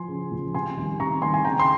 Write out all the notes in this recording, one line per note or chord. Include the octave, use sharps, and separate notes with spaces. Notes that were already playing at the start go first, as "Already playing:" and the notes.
Already playing: F3 G#5 C6
C#3
F3
C3 G#5 C6
D#3 G3
C3 A#5 C#6
D#3 G3 G#5 C6
G#5
C#3 G5 A#5
C6